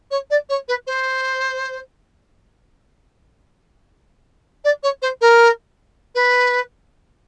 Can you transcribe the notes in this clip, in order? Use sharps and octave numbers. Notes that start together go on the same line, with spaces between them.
C#5
D5
C#5
B4
C5
D5
C#5
C5
A#4
B4